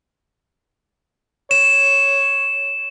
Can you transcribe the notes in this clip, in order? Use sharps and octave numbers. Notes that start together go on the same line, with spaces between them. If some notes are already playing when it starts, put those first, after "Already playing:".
C#5 E7